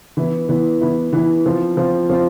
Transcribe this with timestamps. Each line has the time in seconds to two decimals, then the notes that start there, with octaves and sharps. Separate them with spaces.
0.17 E3 B3 E4
0.49 E3 B3 E4
0.81 E3 B3 E4
1.13 E3 B3 E4
1.46 F3 C4 F4
1.77 F3 C4 F4
2.09 F3 C4 F4